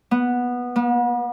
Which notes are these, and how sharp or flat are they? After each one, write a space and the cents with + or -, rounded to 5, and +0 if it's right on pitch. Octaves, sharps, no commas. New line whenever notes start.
B3 -10
B3 -40